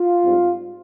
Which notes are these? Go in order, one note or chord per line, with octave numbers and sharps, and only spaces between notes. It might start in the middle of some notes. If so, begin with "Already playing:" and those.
Already playing: F4
G#2 G3 C4